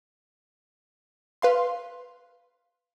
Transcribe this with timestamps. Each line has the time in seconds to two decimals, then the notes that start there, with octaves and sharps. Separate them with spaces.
1.42 B4 F5 C6